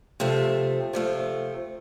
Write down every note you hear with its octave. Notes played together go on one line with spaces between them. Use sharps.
C3 F3 A3
C3 F3 A3